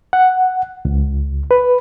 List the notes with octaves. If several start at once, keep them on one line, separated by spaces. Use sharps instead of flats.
F#5
C#2
B4